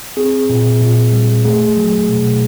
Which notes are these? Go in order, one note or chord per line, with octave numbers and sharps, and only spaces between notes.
C4 G#4
A#2
A#2
G3
A3 G#4
F#3
B2